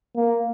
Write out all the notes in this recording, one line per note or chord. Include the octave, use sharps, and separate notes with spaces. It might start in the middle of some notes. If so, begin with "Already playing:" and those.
A#3